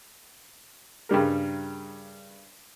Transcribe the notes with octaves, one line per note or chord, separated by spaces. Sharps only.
G2 C#3 G3 A#4